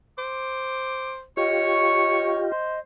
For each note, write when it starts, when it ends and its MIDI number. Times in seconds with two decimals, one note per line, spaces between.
0.18 1.23 72
0.18 1.16 86
1.37 2.52 65
1.37 2.52 67
1.37 2.42 73
1.37 2.79 75
1.37 2.32 85
2.51 2.77 72